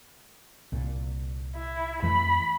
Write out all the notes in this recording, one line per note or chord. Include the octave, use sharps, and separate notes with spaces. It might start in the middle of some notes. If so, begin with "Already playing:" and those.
C2 A#2
E4
F2 E3 A3 B5